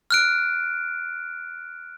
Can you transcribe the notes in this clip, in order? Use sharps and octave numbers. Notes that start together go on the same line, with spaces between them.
F6 F#6 D7